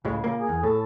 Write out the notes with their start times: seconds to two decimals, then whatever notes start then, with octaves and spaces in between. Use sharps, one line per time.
0.05 C#2 A2 C#3 G#3
0.24 A#2 A#3
0.36 G#4
0.49 E2
0.63 A2 A4